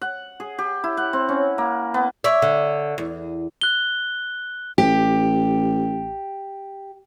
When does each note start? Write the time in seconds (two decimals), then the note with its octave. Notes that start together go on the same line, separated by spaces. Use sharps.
0.02 F#5
0.40 G#4
0.59 G4
0.84 E4
0.97 F#5
1.13 C4
1.29 C#4
1.58 A#3
1.94 B3
2.24 C#5 D5 E5
2.42 D3
2.98 E2
3.61 F#6 G7
4.78 A1 G4